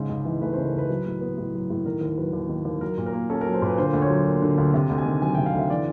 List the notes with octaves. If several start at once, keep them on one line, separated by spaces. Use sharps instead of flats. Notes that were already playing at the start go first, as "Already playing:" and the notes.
Already playing: G#2 C#3
C#2
E3
A3 B4
C#3 C5
A#4
C#2 B4
F#3
A2
B3
A2
F#3
A2
D#3 A#4
D#2 A#4
F#3 B4
D#2
D#3
D#2
F#3 A#4
A#2
A#4
A#3
C#4 A4
A#4
F#3
C5
A#2 B4
D3 C5
D2
C#5
F#3
A#3
D3
D2
C3
D2
G#5
D#3
F#3 G#5
C3 G5
F5
D2 E5
E3 D5